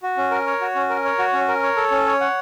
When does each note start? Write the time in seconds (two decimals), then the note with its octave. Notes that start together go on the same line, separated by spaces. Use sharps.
0.03 F#4
0.17 C#4
0.31 A#4
0.46 C#5
0.61 F#4
0.75 C#4
0.89 A#4
1.05 C#5
1.18 F#4
1.33 C#4
1.48 A#4
1.62 C#5
1.77 A4
1.91 C#4
2.06 C#5
2.21 F#5